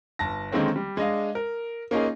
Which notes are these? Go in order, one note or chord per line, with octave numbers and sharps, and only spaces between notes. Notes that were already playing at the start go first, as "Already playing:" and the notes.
G1 A5 A#6
D3 D#3 G#3 A#3 C4 C#4
G3
G#3 D4 D#5 F5
A#4
A#3 C#4 D#4 F4 G#4